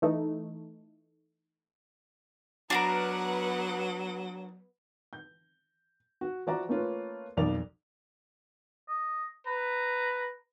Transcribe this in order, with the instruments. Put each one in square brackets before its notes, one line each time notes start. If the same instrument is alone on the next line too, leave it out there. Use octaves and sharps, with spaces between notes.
[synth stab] E3 A3 D#4
[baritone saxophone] F#3 [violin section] B3 B4 F#5 [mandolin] D4 F#4 A#4
[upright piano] G6
F#4
F3 F#4 D5 E5 A#5
A3 A#3 C#4 F4 A#4 B4
B1 F2 A#4 D5 F7
[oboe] D#5
[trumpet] B4 [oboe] A#5